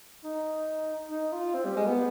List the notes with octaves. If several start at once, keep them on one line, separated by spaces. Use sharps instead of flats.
D#4
D#4
F4
C4
G3
G#3
B3